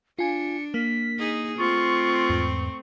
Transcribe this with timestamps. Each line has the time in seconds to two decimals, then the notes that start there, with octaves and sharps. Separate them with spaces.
0.19 D4 F4 G#5 C#7
0.74 A#3 B6
1.19 D#4 G#4
1.58 A3 C4 F4 C#6
2.29 E2 G#2